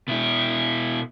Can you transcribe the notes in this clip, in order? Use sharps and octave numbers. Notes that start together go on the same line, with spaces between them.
B2 E4